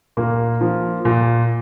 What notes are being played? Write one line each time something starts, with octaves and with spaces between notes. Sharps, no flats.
A#2 A#3
F3
A#2